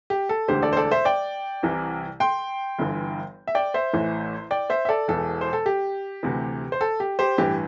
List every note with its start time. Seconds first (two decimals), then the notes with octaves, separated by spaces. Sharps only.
0.10 G4
0.29 A4
0.48 E1 D2 D3 G4 C5
0.62 A4 D5
0.73 C5
0.77 A4 D5
0.91 C5 E5
1.05 D5 G5
1.63 C2 C3 E3
2.20 G5 C6
2.79 G1 G2 E3
3.47 E5
3.55 D5 G5
3.74 C5 E5
3.93 A1 A2 E3
4.51 D5 G5
4.70 C5 E5
4.85 E5
4.89 A4 D5
5.08 E1 E2 E3 A4
5.41 C5
5.53 A4
5.66 G4
6.23 D2 C3 E3
6.72 C5
6.81 A4
7.00 G4
7.19 G4 C5
7.38 A1 G2 E3 G4